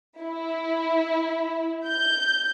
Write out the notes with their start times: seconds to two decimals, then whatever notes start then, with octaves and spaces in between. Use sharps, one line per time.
0.20 E4
1.89 G6